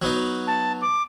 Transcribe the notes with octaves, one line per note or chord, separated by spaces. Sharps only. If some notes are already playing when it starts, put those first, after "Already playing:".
F#3 B3 D#4
A5
D6